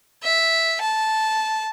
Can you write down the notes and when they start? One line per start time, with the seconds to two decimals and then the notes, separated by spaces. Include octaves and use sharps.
0.23 E5
0.81 A5